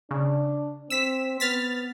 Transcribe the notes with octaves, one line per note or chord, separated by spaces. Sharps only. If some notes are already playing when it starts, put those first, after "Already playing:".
C#3 D4
C4 E6 B6
B3 F6 A6 B6